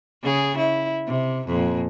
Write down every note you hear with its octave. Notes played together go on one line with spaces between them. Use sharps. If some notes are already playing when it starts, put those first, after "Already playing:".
C#3 G#4
E4
C3
F2 A#2